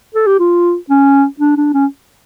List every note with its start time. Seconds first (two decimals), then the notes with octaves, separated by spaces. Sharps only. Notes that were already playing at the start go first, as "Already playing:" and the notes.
0.14 A4
0.27 G4
0.39 F4
0.90 C#4
1.40 D4
1.57 D4
1.74 C#4